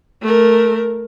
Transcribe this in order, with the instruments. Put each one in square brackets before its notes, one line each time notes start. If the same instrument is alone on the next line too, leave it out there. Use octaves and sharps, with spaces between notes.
[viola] A3 A#4